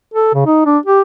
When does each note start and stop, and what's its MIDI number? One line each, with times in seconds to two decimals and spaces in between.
0.14 0.30 69
0.34 0.46 49
0.46 0.65 63
0.66 0.78 62
0.86 1.01 67